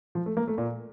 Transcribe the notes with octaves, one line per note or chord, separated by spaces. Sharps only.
F3
A3
A#3
A3
A#2